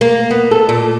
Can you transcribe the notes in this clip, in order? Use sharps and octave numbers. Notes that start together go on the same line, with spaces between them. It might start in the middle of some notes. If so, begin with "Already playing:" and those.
A#3
B3
A4
A#2